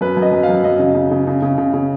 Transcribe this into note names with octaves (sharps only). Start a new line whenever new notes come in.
F#2 B4
F#2
D#5
F#2
F5
F#2
F#2 D#5
C#3
C#3
C#3
C#3
C#3
C#3
C#3